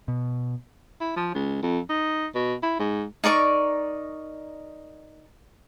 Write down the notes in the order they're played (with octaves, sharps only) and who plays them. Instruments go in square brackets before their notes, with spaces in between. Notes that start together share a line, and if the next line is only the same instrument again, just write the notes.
[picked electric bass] B2
[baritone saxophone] E4
F3
C#2
F2
D#4
B2
E4
G#2
[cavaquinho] D#4 A#4 D5 C#6